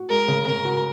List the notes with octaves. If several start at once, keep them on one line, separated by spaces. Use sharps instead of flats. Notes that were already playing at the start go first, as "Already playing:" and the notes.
Already playing: F#4
G#3 A#4
C#3
C#3 A#4
F#4